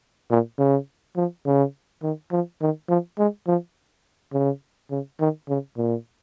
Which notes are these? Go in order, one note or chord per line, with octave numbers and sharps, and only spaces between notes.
A#2
C#3
F3
C#3
D#3
F3
D#3
F3
G#3
F3
C#3
C#3
D#3
C#3
A#2